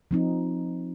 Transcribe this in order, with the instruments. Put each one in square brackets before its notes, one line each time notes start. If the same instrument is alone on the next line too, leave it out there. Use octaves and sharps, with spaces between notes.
[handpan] F3 C4 D#4